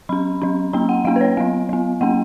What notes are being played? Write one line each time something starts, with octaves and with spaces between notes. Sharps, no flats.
F#3 C#4 B5
F#3 C#4
F#3 A#3 C#4 A#5
F#5
F#3 A#3 C#4 F5
B4
C#5
F#3 B3 F5
F#3 B3
F#3 A#3 C#4 F#5